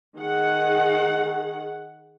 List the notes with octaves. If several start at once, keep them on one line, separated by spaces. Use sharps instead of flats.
D#3 G#4 F#5